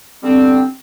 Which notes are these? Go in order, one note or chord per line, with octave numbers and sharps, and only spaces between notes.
D3 G3 B3 C4